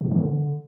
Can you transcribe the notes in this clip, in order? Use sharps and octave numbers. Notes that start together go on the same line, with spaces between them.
B2
G#2
D#3
D3